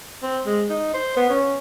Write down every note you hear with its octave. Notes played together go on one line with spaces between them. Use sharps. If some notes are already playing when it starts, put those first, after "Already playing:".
C4
G#3
D#4
C5
B3
C#4